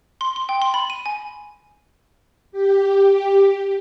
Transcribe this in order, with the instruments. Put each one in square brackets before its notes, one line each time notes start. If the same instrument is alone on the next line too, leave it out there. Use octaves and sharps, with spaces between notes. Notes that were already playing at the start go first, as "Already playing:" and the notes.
[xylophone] C6
C6
G5
C6
B5
D#7
G#5
[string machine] G4